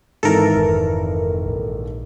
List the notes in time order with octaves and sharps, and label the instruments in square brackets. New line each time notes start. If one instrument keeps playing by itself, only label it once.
[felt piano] G#1 D#3 E3 [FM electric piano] A4 A#4
[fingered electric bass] F1
A#1